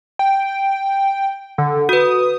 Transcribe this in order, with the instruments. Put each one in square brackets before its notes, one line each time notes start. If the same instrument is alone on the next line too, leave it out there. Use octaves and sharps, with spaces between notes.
[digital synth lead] G5
D3
[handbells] F#4 B4 [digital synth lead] D#6